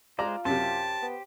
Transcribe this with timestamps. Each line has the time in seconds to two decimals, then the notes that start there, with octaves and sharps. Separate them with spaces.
0.19 G#3 F4 C5 D5 A#5
0.45 F#2 C3 G4 C5 A5
1.02 B3